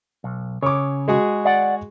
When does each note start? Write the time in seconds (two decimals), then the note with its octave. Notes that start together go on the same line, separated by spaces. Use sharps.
0.24 B1
0.63 C#3 C#5 D6
1.08 G#3 F#4 G#4
1.45 D5 F#5